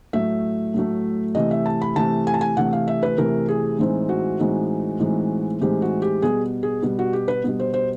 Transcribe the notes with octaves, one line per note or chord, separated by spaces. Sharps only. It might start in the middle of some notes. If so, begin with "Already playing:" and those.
A2 F#3 A3 E5
A2 F#3 A3
C3 E3 A3 D#5
E5
A5
B5
C3 E3 A3 A5
G#5
A5
G#5
C3 E3 A3 F#5
F5
E5
B4
C3 E3 A3 A#4
G#4
A2 E3 G#3 C4 D#4
F#4
A2 E3 G#3 C4 D#4
A2 E3 G#3 C4 D#4
A2 E3 G#3 C4 D#4 G4
F#4
G4
B2 G3 B3 G#4
G#4
B2 G3 B3
F#4
G4
B4
B2 G3 B3
C5
C5